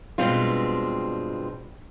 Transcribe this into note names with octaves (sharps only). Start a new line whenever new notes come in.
G2 B2 G#3 C4 F4